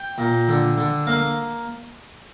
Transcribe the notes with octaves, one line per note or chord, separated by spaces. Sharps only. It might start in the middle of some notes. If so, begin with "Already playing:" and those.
Already playing: G5
A#2
D3
D3
A#3 F5